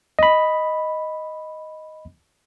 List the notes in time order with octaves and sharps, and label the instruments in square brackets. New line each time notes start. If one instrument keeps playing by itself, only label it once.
[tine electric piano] D#5 B5